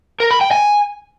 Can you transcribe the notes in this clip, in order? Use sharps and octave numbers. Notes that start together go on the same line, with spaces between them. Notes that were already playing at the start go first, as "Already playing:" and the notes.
A#4
B5
G5
G#5